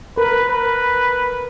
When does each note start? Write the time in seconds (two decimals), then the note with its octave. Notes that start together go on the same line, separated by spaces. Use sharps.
0.17 A#4 B4
0.49 B4